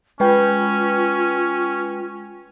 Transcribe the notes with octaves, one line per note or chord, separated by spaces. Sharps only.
G#3 C#4 F4 B4 G5